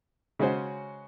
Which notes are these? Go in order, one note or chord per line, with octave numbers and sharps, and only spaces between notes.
C#3 G#3 C#4 F#4 C5